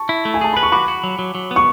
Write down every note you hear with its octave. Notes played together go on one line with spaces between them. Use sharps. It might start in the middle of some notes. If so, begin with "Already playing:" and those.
Already playing: A5 C#6
E4
A3
G#5
G#4 A5
B4 B5
C#6
F#4 B5 D6
F#4
F#3
F#3
F#3
B3
C#6